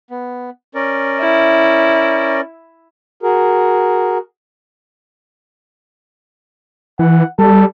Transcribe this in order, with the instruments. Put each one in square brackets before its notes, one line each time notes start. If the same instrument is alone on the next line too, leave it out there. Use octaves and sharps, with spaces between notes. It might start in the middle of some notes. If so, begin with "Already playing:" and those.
[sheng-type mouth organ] B3
C#4 A#4 D5
[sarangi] E4
[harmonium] F#4 G#4 A#4
[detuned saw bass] E3 [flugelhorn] F#5
[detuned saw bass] G3 [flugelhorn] A4